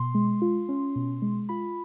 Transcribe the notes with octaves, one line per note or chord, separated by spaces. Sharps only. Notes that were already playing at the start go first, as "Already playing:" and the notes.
Already playing: B2 C6
G#3
F4
C#4
B2
G#3
F4 B5